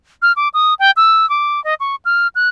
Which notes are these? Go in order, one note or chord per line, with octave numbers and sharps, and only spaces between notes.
F6
D6
D#6
G5
E6
D6
D#5
C#6
F6
F#6